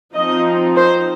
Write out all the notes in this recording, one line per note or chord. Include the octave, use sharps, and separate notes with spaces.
F3 C4 D#4 D#5
C5